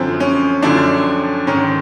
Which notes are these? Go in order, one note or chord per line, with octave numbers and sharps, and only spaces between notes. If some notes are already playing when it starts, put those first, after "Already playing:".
Already playing: F#2 D3 F3 C4
C#4
F#2 D3 F3 D4
G#2 D#3 G#3 C#4